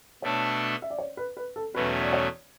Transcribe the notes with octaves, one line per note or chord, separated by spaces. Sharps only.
B2 A3 D4 A4 C#5
E5
D5
C#5
B4
B4
A4
E2 B2 F#3 A3 C#4 B4
D5
C#5